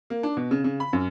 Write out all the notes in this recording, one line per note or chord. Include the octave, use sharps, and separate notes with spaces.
A#3
D4
B2
C#3
C#3
B5
F#2